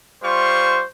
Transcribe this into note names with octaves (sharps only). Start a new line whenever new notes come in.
G3 F4 C5 C#6